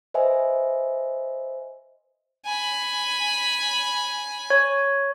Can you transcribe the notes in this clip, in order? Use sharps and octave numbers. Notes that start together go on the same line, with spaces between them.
B4 C5 D#5 E5 G#5
G#5 B5
C#5